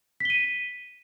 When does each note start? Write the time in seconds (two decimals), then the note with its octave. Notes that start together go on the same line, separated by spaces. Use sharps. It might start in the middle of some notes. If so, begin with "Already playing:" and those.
0.20 B6
0.25 G7
0.30 D#7